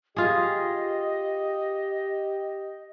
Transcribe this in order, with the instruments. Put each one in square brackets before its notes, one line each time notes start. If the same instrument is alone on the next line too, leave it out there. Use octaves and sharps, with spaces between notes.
[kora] F4 G#4 [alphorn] G4 [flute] D#5